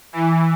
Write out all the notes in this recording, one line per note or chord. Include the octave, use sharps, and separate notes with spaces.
E3